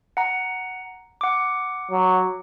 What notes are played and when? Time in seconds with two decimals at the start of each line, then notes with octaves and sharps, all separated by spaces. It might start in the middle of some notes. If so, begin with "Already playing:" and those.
0.17 F#5 A#5
1.21 F#5 D6
1.91 F#3